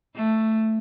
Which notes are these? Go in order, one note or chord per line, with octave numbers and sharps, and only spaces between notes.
A3